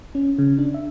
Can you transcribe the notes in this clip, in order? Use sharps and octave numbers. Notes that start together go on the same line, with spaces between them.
C#4
C#3
D4
E5